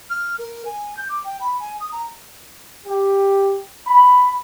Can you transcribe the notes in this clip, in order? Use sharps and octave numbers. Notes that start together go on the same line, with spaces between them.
F6
A#4
G#5
G6
D6
G5
B5
G#5
D#6
A#5
G4
B5